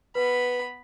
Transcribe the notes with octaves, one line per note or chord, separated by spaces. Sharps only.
B3 B4 B5